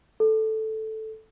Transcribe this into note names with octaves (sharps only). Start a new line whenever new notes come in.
A4